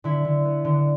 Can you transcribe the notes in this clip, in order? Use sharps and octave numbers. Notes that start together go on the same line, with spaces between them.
D3 E4
D3
B3
D3